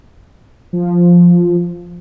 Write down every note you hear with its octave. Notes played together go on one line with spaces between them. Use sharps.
F3